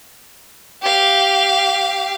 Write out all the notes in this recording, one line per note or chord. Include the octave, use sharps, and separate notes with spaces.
G4 F5